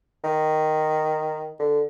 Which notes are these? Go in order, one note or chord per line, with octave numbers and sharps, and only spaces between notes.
D#3
D3